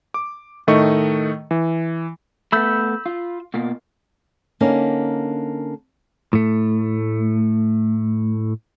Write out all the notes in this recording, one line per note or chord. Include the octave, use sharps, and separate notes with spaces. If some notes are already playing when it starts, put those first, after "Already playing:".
D6
A2 D#3 A3 D#5 C#6
E3
A3 B3 B5 E6 G6
F4
B2 A#3 F4
D3 A#3 C#4 D#4
A2 A3